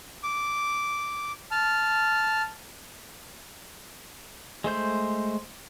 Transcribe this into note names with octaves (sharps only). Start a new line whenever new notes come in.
D6
A5 F6
G#3 A3 C5 G6